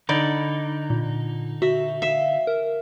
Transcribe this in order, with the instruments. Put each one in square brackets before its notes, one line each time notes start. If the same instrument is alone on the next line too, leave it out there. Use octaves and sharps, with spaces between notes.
[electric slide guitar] D3 D#4 [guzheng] D5 [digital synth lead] B5
[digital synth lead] A#2
[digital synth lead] F#4 [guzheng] E5
[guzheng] E5 [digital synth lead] F5
[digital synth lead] A#4